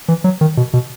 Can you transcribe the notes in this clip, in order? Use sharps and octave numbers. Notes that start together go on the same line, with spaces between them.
E3
F#3
D#3
B2
B2